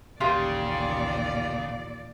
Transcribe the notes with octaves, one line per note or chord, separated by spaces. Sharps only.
A1 D#2 A#2 C#3 F4 G4 A#4 D5